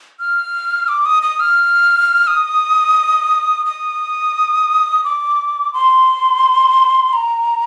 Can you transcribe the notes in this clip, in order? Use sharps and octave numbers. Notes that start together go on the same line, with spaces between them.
F6
D6
D#6
D#6
F6
D#6
D#6
D6
C6
A#5